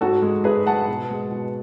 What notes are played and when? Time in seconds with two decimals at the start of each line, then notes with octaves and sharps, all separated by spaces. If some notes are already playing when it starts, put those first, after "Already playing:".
0.01 G#2 F#4 A4
0.22 G#3
0.44 G#2 G#4 B4
0.66 G#3 F#5 A5
0.88 B2
1.10 G#3
1.31 B2